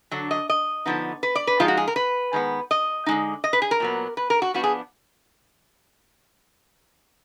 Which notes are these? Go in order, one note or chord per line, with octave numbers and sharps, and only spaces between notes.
D3 F#3 D4
D#5
D#5
D3 F3 B3 D#4
B4
D5
B4
F3 G#3 D#4 F4
F#4
G#4
A#4
B4
D#3 G#3 B3
D#5
D3 G#3 D#4
D#5
B4
G#4
A#4
A#2 F#3 B3
B4
A#4
F#4
F3 B3 D4 F#4
G#4